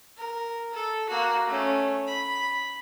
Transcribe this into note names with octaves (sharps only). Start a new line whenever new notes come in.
A#4
A4
A#3 F#4
A3 C#4
B5